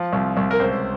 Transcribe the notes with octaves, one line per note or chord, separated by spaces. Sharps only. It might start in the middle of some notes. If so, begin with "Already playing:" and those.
Already playing: F3
C2
C2
A#4
C#2 C5